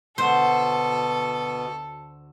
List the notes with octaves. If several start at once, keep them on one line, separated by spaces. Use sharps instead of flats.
D2 B2 F#4 A4 C5